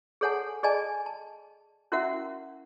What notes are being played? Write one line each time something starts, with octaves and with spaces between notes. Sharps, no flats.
G#4 A4 C#5 F#5 G#5 A5
G#4 D5 D#5 G#5 A5
A5
C#4 E4 F#4 A#4 E5 F#5